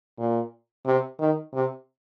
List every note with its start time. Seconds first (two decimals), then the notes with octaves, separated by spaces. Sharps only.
0.18 A#2
0.86 C3
1.19 D#3
1.53 C3